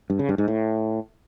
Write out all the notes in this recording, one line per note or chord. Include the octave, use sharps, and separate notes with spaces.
G2
C#3
G2
G#2
A2